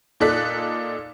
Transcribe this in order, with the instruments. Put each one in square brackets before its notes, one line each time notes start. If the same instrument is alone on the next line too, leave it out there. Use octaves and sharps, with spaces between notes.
[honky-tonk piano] A#2 D#4 A4 D5 F#6 B6